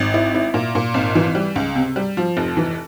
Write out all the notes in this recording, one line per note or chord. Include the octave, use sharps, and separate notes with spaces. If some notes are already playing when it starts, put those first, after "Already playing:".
Already playing: G#1
E4
E4
A#2
A#2
G#1
E3
G3
C#2
C3
G3
F3
F1
E3